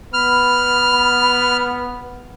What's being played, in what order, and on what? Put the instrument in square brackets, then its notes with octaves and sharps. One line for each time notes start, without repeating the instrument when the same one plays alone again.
[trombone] B3 [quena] B5 [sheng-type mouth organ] F6